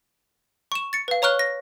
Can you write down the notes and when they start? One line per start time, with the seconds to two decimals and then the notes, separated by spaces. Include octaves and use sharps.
0.72 C#6 E7
0.93 A6 C#7
1.08 B4 F5
1.22 C#5 A#5 C#6 F6 F#6 G7
1.39 A#6